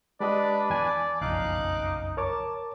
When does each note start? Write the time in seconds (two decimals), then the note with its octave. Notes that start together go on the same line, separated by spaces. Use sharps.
0.20 G#3 D4 G4 B4 D5 D#5
0.70 E2 D5 G#5 A5
1.21 F#1 B1 F2 D#4 F5 D6 F#6
2.17 A#4 C#5 A5 D6